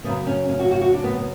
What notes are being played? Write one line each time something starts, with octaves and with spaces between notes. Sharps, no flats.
F#2 C#3 F#3 B3
C#4
C#4
F#4
F#4
F#4
D4
B3
B3